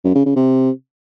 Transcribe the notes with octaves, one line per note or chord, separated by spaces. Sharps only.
F#2
C#3
C#3
C3